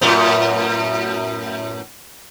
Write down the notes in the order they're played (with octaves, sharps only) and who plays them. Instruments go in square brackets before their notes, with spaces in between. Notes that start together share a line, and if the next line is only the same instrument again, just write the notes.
[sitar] F#2 A2 B3